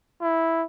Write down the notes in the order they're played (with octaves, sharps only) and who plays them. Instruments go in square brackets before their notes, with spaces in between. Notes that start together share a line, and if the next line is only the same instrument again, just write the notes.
[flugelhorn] E4